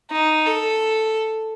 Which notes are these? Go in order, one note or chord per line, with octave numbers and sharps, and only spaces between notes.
D#4
A4